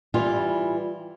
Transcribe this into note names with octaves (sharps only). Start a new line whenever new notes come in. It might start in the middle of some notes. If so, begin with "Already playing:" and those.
E3 G3 F4